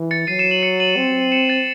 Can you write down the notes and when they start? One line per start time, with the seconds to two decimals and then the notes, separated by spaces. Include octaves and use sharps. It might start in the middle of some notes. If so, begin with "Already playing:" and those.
Already playing: E3
0.11 A6 C#7
0.27 F#3 C7 D#7
0.39 C#7 E7
0.51 D#7 F#7
0.62 C#7 E7
0.80 D#7 F#7
0.97 C4
1.32 C#7 E7
1.49 A6